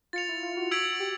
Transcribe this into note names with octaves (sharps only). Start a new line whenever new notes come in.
F4 A6 C#7 F7
E4
F4
F#4
E6 G#6 B6 D7 F#7
G4